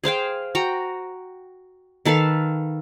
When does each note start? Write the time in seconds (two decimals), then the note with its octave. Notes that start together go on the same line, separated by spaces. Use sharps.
0.04 G#4 C5 F5 G5
0.55 F#4 G5 A#5
2.05 D#3 A4 B4 F5